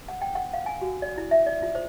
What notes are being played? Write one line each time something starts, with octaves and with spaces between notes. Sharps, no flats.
F#5
G5
F#5
F5
G#5
F#4
D5
E4
E5
D5
F4
C5